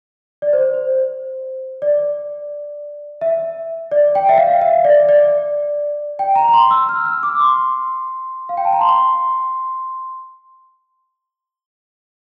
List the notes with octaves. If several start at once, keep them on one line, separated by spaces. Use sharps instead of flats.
D5
C5
C5
D5
E5
D5
G5
E5
F5
E5
D5
D5
G5
A#5
A#5
C6
E6
F6
E6
D6
C6
F5
G5
A5
A#5
C6